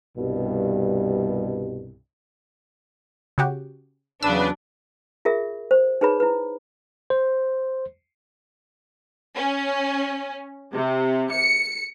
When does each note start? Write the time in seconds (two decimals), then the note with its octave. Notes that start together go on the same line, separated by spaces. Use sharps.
0.18 C2 G2 B2
3.38 C#3 F#4 G4
4.23 E2 C#3 F#3 D4 B4 E6
5.25 F4 G#4 A#4 E5
5.71 C5
6.01 D#4 G#4 B4 C#5 B5
6.20 E4 B4
7.10 C5
9.35 C#4
10.74 C3
11.32 C#7